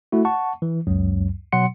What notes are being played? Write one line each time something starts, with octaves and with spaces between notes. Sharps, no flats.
A3 E4 F#4
F#5 A5 C#6
E3
C#2 F#2 F#3
B2 F#3 F#5 C6 C#7